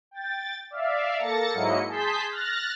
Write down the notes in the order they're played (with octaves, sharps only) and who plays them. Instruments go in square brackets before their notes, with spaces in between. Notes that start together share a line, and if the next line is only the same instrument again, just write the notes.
[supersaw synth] G5 A6
D5 E5 F5
A#3 A4 A6 A#6 C#7
G#2 F#3 A#3 E4 D#5 C#7
G#4 A5 C6 G6 B6
F6 F#6 A6 A#6